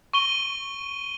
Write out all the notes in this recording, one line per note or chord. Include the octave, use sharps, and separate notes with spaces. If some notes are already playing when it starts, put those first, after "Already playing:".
C#6 D#7 G7